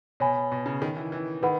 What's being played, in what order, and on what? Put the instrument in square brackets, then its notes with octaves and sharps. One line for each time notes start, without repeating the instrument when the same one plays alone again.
[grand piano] B2 [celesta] C#5 G#5 B5
[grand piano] B2
C#3
D#3
E3
E3
[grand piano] D#3 [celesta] B4 F#5 B5